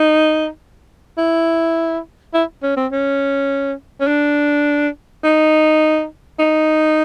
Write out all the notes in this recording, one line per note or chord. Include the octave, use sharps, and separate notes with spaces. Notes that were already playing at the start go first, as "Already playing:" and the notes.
Already playing: D#4
E4
E4
C#4
C4
C#4
C#4
D4
D#4
D#4